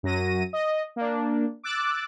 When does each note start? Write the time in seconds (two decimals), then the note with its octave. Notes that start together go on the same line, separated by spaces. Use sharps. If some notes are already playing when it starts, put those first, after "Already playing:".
0.03 F#2 F#3 A#6 D#7
0.53 D#5
0.96 A#3 D4
1.64 D6 E6 F#6 A6